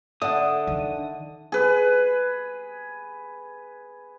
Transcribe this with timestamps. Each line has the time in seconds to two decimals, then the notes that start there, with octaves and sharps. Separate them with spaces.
0.22 D3 E5 F#5 D#6
0.67 D#3
1.52 G#4 B4